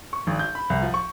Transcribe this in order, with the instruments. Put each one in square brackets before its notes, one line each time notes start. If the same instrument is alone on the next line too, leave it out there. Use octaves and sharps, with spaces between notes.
[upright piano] C#6
G#1
G6
B5
C2
F3
C#6